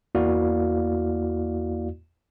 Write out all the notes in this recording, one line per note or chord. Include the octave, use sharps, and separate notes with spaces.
E2 A#3 E4 F#4 D5 F5